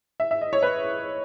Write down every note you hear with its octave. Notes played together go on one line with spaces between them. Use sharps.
E5
E5
D#5
C#5
B4